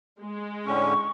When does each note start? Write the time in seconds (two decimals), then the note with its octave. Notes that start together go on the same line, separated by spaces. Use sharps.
0.21 G#3
0.66 A2 D3 C#4 C#6